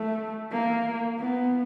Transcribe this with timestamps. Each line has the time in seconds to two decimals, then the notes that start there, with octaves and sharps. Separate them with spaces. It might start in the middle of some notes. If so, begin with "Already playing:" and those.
Already playing: A3
0.51 A#3
1.19 B3